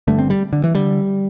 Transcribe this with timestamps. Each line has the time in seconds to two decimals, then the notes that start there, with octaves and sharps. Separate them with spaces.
0.07 G1 G2 D3 A3
0.19 C4
0.30 G3
0.53 D3
0.64 E3
0.75 D3 G3